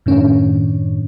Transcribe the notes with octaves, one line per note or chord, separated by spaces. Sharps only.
F#2 A2 D#3 C#4 D4